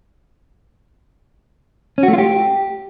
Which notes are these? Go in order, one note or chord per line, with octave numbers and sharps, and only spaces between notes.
C#4
F#4
A3
F4
G4